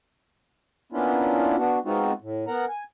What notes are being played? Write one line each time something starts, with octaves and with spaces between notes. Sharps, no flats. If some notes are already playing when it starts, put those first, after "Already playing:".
A#3 B3 C#4 D4 E4 F4
B3 D4 F#4
G#3 B3 C4 D#4 F4 F#4
A2
B3 A#4 F#5 A#5
G#5